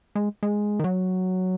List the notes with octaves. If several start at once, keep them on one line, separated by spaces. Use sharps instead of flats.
G#3
G#3
D#3
F#3